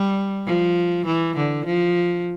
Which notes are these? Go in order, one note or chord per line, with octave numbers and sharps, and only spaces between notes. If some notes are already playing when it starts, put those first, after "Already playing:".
Already playing: G3
F3
E3
D3
F3